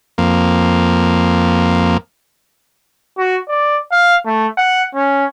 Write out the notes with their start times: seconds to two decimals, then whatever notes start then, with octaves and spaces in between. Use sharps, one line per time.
0.18 F2 A#3
3.18 F#4
3.48 D5
3.92 F5
4.26 A3
4.58 F#5
4.95 C#4